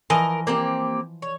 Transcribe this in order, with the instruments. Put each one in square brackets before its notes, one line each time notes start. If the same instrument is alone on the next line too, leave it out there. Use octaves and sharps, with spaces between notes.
[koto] E3 F3 D#5 [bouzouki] A#4
[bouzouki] A#3 C4 G4
C#5